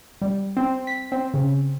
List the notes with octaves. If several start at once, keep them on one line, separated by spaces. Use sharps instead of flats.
G3
C4
B6
C4
C#3